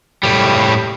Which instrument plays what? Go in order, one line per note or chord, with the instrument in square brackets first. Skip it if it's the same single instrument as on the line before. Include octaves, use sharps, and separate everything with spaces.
[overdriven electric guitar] A2 G3